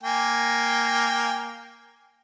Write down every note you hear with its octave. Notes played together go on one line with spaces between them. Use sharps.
A#3 G5 G#5